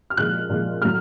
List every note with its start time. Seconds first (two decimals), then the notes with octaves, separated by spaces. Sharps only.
0.10 F6
0.17 A#2 F3 G#3 F#6
0.50 A#2 F3 G#3
0.82 A2 F#3 F6